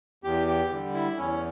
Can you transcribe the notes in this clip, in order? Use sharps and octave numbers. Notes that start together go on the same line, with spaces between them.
E2 G4
G4
D3 G3
E4
E2 C#4